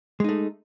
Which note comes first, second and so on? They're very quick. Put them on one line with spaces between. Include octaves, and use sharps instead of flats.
G#3 D#4 A3